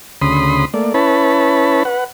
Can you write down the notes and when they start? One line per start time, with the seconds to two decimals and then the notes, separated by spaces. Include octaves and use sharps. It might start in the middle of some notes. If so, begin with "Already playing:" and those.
0.21 D2 C#3 B5 C6 D#6
0.74 A3 A#3 D5
0.94 C#4 E4 B4 C#5 A5 B5
1.85 B4 F#5